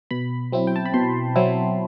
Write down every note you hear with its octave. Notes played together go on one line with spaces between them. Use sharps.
B2 B5
F#3 C4 E4
G5
A5
B5
B2 C6
F#3 C4 E4